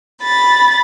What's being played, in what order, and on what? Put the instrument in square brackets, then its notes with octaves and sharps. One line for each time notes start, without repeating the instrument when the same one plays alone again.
[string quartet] B5 A6